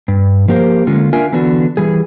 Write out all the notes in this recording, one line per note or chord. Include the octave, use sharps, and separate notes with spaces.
G2
F3 A#3 G4 A#4 C5
D3 G#3 A#3 C#4 F4
D4 F4 A#4 E5 G#5
D3 E3 B3 D4 F#4
E3 G3 G#4